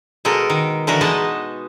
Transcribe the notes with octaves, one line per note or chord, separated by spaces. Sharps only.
B2 G#3 A4 A#4
D#3
D3 E3 F#4 A#4
B2 G#3 B3 D#4 D#5 A5